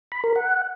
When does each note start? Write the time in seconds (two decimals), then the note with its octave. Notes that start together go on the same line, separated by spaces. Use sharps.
0.12 B5
0.24 A#4
0.36 F#5